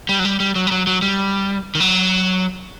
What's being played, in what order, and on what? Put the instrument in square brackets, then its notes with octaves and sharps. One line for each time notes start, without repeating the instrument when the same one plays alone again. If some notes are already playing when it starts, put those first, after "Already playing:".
[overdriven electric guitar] G3
F#3
G3
G3
F#3
G3
F#3
F#3
G3
D#3
F#3